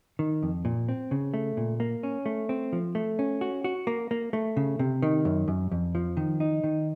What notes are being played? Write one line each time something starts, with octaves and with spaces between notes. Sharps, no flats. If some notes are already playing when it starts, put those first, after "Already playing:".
D#3
F2
A#2
C4
C#3
A3
A#2
A#3
C#4
A3
C4
F3
A3
C#4
F#4
F#4
A#3
A#3
A3
C#3
C3
D#3
F#2
F#2
F2
F3
D#3
D#4
D#3